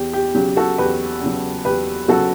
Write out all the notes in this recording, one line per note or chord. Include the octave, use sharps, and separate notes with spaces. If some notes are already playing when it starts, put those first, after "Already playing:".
Already playing: E2 G4
G4
C#3 F#3 G4
F#4 A4
E2 G4 B4
C#3 F#3
E2 G4 B4
C#3 F#3 F#4 A4